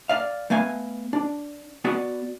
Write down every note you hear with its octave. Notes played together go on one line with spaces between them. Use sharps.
D5 F5
A3 B3 F5 G#5
D4
B3 F#4 D5